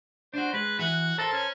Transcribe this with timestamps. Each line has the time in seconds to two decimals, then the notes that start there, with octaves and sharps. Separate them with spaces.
0.34 D4 F#4 C5
0.53 G#3 B4
0.79 E3 F#4
1.18 A4 A#4 C5 A5
1.32 C#4